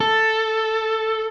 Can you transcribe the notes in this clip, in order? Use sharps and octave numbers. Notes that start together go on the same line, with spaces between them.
A4